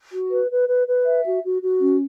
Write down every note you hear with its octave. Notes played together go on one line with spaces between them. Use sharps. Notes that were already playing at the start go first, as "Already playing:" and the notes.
F#4
B4
B4
B4
B4
E5
F#4
F#4
F#4
C#4